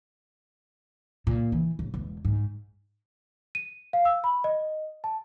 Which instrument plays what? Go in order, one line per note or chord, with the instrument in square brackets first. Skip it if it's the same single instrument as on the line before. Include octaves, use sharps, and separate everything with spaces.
[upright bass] A#2
E3
D1
E1
G#2
[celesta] D#7
F5
E6
B5
D#5
A5